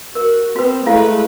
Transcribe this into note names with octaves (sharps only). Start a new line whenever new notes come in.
F#4 A#4
B3 C4 F#4 B4
G#3 A3 E4 B4 F5